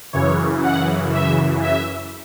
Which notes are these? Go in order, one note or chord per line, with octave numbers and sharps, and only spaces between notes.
F#2 C#3 E3 C#5
F#5
E5
E5